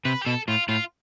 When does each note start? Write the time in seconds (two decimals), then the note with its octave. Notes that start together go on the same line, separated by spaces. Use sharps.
0.05 C3 B4
0.22 G4
0.26 B2 A4
0.48 A2 F4
0.68 A2 F4